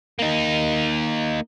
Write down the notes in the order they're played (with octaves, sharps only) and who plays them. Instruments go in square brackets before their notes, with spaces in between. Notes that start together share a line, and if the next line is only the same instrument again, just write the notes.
[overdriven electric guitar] A#3 D#4